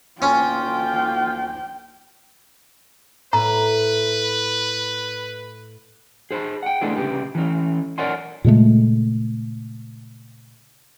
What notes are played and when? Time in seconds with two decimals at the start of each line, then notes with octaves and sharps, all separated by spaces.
0.22 D2 A#3 C#4 F4 G5
3.33 A2 B4 A#5
6.31 G#4 C5 F5 A5 B5
6.63 F#5 G5
6.81 G#3 A3 B3 D4 E4 G#4
6.96 C2 C#3 G4 B4
7.35 E3 C#4
7.98 A#4 C#5 D5 F#5 G#5 C6
8.44 A#2 C#3 G#3 A3